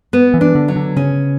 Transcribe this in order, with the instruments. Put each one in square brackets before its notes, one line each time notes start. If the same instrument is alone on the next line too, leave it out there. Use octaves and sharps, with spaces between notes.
[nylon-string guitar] B3
[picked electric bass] E3
[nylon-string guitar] D4
[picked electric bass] D3
[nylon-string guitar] F#3
[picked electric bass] D3
[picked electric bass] C#3 [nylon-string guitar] C#4